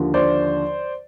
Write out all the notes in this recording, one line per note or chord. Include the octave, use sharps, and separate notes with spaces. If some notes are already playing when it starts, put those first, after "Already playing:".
Already playing: D#2 D3 F3
C5 D5